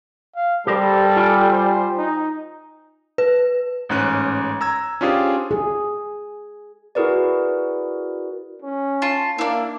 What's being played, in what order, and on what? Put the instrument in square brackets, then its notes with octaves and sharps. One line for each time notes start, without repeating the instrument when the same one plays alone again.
[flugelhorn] F5
[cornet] G3 [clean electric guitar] G4 A#4 C5 [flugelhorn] A4
[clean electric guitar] F4 G5 G#5
[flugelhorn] C5
D#4
[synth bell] B4
[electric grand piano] A1 G#2 C#4 F#6
A#5 E6 G#6
C#4 D4 F4 G4 G#4 C5
[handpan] G#4
[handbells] E4 F#4 G#4 A#4 B4 D5
[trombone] C#4
[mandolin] F4 A5
[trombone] A#3 [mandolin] D4 E4